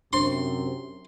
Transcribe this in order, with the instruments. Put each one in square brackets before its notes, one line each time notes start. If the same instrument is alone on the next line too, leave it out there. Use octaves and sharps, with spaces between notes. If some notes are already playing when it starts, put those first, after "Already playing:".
[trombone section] F#2 C3 [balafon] D4 C5 [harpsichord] C6